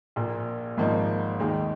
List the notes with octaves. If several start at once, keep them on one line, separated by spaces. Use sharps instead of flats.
A#1 A#2 A#3
G#1 G#2 F3 A#3 D#4
D#2 D#3 G#3 D#4